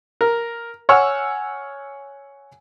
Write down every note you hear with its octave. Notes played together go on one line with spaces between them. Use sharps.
A#4
C#5 F#5 G#5 C#6 E6 F6